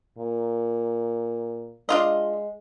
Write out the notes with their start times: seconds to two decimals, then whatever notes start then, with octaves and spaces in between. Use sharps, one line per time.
0.18 A#2
1.89 G#3 D4 F4 D#5